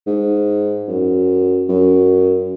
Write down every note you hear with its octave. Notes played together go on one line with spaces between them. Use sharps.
G#2
F#2
F#2